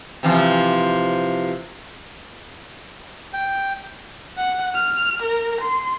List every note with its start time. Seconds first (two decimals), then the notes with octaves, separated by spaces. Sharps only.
0.23 C3 E3 F3
3.33 G5
4.37 F#5
4.74 F6
5.22 A#4
5.61 C6